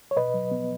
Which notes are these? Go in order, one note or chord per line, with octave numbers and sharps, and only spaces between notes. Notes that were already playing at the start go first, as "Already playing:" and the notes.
C#5
B2 B4 D#5
F#3
B3